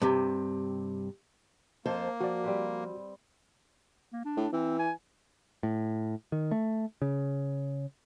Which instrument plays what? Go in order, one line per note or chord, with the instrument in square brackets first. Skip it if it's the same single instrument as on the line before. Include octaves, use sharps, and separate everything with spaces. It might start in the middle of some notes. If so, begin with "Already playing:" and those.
[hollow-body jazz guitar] G2 C3
[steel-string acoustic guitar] F2 C5 A5 [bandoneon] A#3
[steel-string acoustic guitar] F3 [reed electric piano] F#4 D5
[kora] G3 C4 B4
[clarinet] A#3
D4
[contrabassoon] A2
[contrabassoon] E3 [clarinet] C4
[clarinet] G#5
[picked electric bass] A2
D#3
A3
C#3